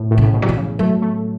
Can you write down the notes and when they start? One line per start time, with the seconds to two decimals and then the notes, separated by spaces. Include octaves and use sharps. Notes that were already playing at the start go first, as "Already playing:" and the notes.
Already playing: A2
0.11 A2
0.18 C#3
0.23 A2
0.34 B2
0.42 F#3
0.49 E3
0.57 C#3
0.79 F#3 A3
1.02 A3